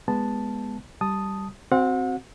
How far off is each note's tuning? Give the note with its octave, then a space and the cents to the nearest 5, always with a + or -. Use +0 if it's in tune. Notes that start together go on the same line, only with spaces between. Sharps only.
G#3 -5 B3 -5 A5 +0
G3 -10 A5 +0 D#6 +0
C4 +0 F#4 +10 F#5 -35